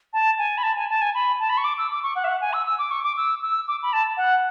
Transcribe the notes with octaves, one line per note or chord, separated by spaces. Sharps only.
A5
G#5
B5
A5
G#5
A5
G#5
B5
A5
B5
C#6
D6
E6
D6
C#6
F#5
E5
F#5
G#5
E6
E6
D6
C#6
D6
E6
E6
D6
B5
A5
F#5